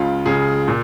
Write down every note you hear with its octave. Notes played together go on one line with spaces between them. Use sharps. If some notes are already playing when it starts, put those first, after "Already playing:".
Already playing: C#2 C#3 F4
C#2 C#3 G#4
A#2